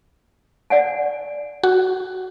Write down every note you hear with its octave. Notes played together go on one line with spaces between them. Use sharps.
D5 F#5 G#5
F#4